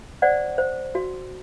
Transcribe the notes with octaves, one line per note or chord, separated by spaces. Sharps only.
C5 D5 F#5
C5
F#4